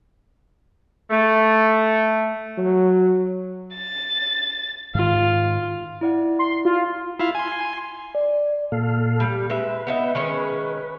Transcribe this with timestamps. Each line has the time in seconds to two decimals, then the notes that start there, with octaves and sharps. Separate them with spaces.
1.11 A3
2.58 F#3
3.75 A6
4.95 G#2 D#3 G#3 F4
6.01 E4 D5 F#5
6.39 C6
6.65 F4
7.19 E4 F4 F5
7.35 G#5 C6
8.15 D5
8.72 A#2 A4 F5
9.20 G3
9.50 G#3 B4 E5
9.87 B3 D#4 E5
10.15 D#3 G#3 C#4